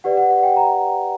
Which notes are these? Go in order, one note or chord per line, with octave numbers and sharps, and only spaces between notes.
G4 B4 D5 F#5
F#5
F#5
G5
A#5